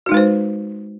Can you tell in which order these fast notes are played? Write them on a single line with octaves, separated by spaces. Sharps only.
F#4 D#4 G#3 B4 C5